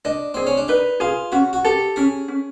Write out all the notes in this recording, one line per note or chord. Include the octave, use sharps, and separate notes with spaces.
D4 D#5
C4 G#4
C#4
D4
D#4 B4
F4 G#4
C#4 F#4
F#4
G4 A4
C#4 G#4
C#4